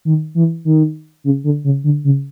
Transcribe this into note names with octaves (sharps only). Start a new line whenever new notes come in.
D#3
E3
D#3
C#3
D3
C#3
D3
C#3